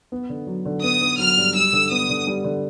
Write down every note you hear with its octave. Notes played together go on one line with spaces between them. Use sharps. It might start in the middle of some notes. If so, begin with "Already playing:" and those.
B3
D3
F#3
D3
B3 D#6
B3
F#3 F6
G2
G3 E6
D3
B3 D#6
D3
G3
D3